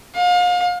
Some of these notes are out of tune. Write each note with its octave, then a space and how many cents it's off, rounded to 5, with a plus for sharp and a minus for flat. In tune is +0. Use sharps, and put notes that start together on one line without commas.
F5 +35